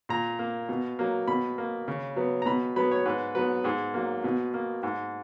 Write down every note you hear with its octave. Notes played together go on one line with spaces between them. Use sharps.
A#2 A#5
A#3
B2
F#3 A#3
B2 B5
A#3
C#3
F#3 B3
A#5
B2 B5
F#3 B3 B5
C#5
G#2 B4
F#3 B3 B4
G#2 G#4
F#3 A#3
B2
A#3
G#2